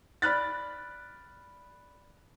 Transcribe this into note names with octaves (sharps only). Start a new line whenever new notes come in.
D5 B5 F6 F#6 A6